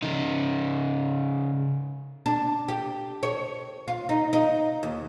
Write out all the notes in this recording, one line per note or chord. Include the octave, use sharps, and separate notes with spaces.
C#3 D#4
D4
G4
C#5
F4
D#4
D#4
D#2